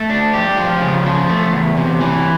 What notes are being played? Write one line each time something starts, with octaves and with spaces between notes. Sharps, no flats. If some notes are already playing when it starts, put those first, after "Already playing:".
Already playing: A3
D4
G4
F3
C#3
F3
A3
E2
C3
E3